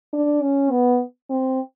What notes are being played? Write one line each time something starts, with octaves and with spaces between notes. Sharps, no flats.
D4
C#4
B3
C4